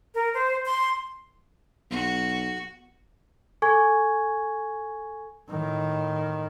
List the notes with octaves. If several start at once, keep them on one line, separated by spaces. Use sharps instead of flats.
A#4
C5
C6
B1 F#4
A4 G#5 C#6 G#6
A2 D#3